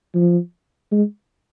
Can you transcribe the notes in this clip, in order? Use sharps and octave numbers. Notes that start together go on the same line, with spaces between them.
F3
G#3